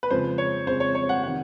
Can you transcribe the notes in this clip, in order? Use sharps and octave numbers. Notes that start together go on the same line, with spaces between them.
B4
F2 C#3 F3 G#3 C5
C#5
F2 C#3 F3 G#3 C5
C#5
C#5
F#5
C3 D#3 F#5